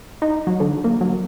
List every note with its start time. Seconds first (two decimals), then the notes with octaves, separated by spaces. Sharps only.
0.22 D#4
0.47 F#3
0.60 D3
0.84 A#3
1.01 F#3